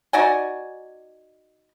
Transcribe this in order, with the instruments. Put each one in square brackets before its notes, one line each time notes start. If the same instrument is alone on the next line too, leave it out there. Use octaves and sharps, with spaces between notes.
[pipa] D#4 F#4 D5 G#5